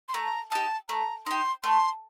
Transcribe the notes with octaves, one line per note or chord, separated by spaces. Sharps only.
C6
A3 A#5
D#4 G4 A5
A3 A#5
D#4 G4 C6
A3 C6